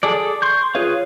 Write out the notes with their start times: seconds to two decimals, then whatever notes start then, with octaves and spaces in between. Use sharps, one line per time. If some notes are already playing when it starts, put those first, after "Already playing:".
0.03 G#4 A4 D5
0.42 C6 C#6 G6
0.75 F4 G#4 B4 C#5 F5